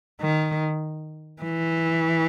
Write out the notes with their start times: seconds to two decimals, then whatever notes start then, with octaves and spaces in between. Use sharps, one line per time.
0.21 D#3
1.42 E3